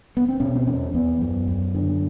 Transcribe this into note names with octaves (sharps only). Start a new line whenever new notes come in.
B3
C4
B2 C#4
C4
E2 C#4
E2 B3
F#2
F#2
D3